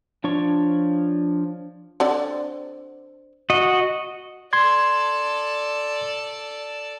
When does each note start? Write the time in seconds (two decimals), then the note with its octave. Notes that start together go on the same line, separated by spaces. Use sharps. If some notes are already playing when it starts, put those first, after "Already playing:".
0.24 F3 D4 C#5 C#6
2.00 D3 C4 D5
3.50 F#4 D#5
4.53 A4 D5 C6 G#6